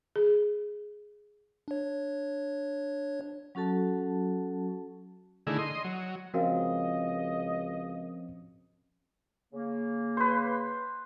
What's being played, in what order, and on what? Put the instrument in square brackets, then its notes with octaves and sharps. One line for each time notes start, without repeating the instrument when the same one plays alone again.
[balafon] G#4
[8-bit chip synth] D4 C#5
[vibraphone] F#3 C#4 F#4 A4 A5
[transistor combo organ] D3 D#3 A3 E4 G#4
D#5 C6
F#3
[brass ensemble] C#2 D#5 [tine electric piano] F3 C4 C#4 [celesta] F#4 A#4 F5
[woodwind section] C#3 A#3
[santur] B4 C5